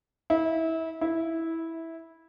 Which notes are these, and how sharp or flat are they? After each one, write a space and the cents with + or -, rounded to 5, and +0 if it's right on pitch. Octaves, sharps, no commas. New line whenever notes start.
E4 -25
E4 -10